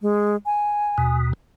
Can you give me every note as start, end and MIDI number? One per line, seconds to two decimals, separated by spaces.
0.01 0.36 56
0.46 1.16 80
0.98 1.33 39
0.98 1.33 47